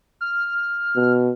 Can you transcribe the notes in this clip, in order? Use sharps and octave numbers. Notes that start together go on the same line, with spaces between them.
F6
B2